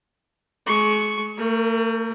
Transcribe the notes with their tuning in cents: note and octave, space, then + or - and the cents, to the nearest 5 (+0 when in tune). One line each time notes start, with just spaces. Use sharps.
G#3 +35 C#6 +0
A3 +45 A#4 +0